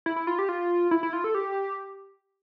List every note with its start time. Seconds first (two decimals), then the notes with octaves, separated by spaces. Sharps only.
0.06 E4
0.16 E4
0.27 F4
0.39 G4
0.49 F4
0.91 E4
1.03 E4
1.13 F4
1.24 A4
1.35 G4